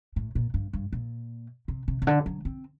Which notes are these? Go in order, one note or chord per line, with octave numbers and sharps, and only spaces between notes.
A2
A#2
G2
G2
A#2
C3
C3
C3
D3
F#3
C4